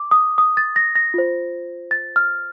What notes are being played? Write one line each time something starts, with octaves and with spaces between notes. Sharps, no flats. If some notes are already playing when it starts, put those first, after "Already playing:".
Already playing: D6
D#6
D#6
A6
A#6
A#6
F4 C5
A6
F6